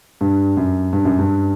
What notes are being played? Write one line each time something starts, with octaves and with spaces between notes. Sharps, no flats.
G2
F#2
G2
F#2
G2